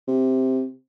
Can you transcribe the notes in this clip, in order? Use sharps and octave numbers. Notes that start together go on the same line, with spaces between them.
C3